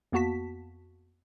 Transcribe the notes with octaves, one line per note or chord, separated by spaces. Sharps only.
F2 A#3 B3 F#4 A5 B6